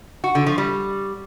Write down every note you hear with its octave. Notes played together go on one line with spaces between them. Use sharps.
F#4
D3
F3
G3